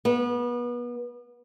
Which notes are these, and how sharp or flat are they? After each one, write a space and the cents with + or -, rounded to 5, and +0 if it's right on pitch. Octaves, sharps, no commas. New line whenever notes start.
B3 -30